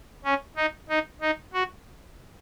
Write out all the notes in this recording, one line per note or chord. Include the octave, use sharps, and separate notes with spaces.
C#4
D#4
D#4
D#4
F#4